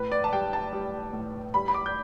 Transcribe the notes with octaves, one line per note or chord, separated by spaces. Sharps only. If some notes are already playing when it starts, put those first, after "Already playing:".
Already playing: A2 B4
D5
A5
G3 G5
A5
G3
A2
G3 B5
B5
D6
G6